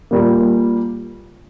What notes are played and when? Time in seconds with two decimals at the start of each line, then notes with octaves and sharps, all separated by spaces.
0.11 A#2 G3 A#3